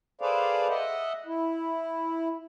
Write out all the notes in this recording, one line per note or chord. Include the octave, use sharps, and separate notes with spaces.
G#4 A4 B4 C5 D5 F5
D#5 E5 F#5
E4